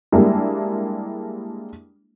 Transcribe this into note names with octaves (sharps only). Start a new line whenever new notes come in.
G3 G#3 A#3 D4 E4